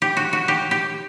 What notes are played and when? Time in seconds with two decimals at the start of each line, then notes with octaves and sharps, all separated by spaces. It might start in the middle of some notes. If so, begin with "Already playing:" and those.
0.02 G4
0.17 F#4
0.33 F#4
0.48 G4
0.71 G4